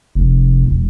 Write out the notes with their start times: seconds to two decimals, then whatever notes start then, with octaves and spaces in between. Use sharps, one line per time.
0.15 F1
0.66 E1